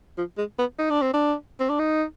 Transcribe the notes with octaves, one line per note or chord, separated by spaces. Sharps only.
F3
G#3
B3
D#4
D4
C4
D4
C4
D4
D#4